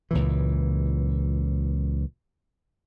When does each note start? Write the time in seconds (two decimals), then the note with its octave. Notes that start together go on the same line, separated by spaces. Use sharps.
0.11 C#2 A#2 E3